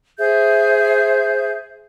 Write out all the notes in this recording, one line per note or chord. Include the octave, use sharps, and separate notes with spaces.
G#4 C5 E5 G6